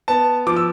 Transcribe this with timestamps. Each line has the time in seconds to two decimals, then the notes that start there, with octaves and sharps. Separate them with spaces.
0.08 B3 A5
0.47 F3 D6
0.56 E6